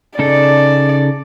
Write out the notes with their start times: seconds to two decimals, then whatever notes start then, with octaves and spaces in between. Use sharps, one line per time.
0.19 C#3 D#4 A4 D5